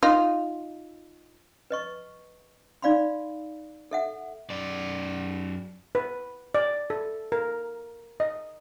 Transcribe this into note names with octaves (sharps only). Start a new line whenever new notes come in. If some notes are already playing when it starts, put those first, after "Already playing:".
D#4 F4
B4 D#5 C#6
D#4 D5 F5 B5 C6
A4 E5 F#5
F#2 D5
B4
D5
A4
A#4
D#5